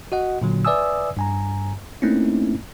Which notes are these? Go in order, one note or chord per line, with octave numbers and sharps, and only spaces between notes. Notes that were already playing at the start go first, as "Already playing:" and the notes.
F#4 D#5 F#5
A#2 D3 F#3
B4 D5 E5 G#5 D#6 E6
G2 G#5 A#5
A3 A#3 C4 C#4 D#4 E4